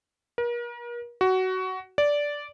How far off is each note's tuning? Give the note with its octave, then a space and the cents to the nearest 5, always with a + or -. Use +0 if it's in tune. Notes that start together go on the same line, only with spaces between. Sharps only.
A#4 +40
F#4 +15
D5 -10